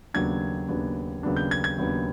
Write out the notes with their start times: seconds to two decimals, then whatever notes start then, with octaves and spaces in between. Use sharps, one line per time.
0.14 D#2 C#3 F#3 B3 D4 G#6
0.68 D#2 C#3 F#3 B3 D4
1.23 D#2 C#3 F#3 B3 D4
1.36 G6
1.51 G#6
1.64 G#6
1.78 D#2 C#3 F#3 B3 D4